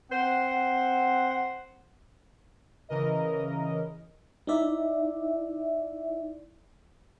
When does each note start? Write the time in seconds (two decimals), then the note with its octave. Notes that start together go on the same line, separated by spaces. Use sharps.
0.11 C4 C5 F#5
2.89 C#3 E3 A#4 D#5
4.47 D#4 E4 D5 E5